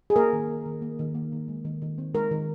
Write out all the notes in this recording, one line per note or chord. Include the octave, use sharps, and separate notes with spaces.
G#4
A#3 A#4
D#3
A#3
D#3
A#3
D#3
A#3
D#3
G#3
D#3
D#3
C4
G#3 A#4
D#3